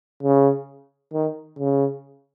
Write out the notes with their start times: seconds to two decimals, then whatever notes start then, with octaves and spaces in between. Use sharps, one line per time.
0.23 C#3
1.13 D#3
1.58 C#3